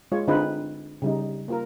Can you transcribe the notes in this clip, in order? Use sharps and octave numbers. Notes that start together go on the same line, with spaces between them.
G#3 F4 C#5
D3 C4 D#4 F4 G#4 B4
C#3 G3 D#4
A#3 F4 A#4